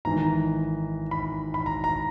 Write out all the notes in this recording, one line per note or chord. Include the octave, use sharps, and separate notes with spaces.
G#1 G#2 E3 A#5
B5
B5
A#5
A#5